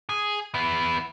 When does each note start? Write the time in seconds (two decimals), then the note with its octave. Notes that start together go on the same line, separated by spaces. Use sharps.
0.09 G#4
0.54 B3 E4